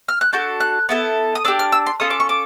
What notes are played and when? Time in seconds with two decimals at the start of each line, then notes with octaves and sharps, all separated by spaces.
0.08 F6
0.21 F#6
0.33 D4 F#4 A4 G6
0.60 F#6
0.89 B3 E4 A4
1.35 D#6
1.45 D4 E6
1.48 G4
1.59 F6
1.72 E6
1.86 C6
2.00 C#4 F4 A4 D#6
2.10 D6
2.20 C#6
2.29 D6